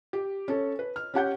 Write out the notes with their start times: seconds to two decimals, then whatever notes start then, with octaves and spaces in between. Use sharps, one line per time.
0.13 G4
0.48 C#4 A4
0.79 B4
0.96 F6
1.14 C#4 G4 F#5 G6